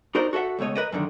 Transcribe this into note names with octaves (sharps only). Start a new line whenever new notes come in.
D#4 F#4 A#4 C5 D5
F#4 A4 D5 E5 F#5
C#2 B2 A3 C#5 D#5
A#4 B4 D5 D#5
F#2 A2 D3 D#3